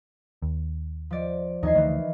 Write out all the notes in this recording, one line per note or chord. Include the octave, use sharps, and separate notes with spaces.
D#2
F3 D5
D#2 E3 F3 D#4 G#6 C7
D2 D#3 E3